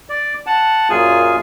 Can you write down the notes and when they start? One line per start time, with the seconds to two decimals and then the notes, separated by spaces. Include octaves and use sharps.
0.09 D5
0.46 F#5 A5
0.90 F#2 A#2 F4 G#4 G#5